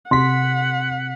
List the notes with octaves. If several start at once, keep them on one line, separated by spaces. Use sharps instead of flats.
C3 F#5 C6 B6